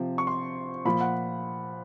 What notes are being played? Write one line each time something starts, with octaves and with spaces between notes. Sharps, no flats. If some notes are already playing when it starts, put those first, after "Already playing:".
Already playing: C3 F3
C#6
C6
A#2 F3 B5
F#5